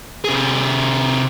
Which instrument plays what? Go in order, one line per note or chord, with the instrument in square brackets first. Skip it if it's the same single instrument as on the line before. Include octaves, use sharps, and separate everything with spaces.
[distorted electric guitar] C3 G#4